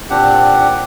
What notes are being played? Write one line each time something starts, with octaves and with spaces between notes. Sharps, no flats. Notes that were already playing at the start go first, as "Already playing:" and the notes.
A#2 C4 D4 G4 F#5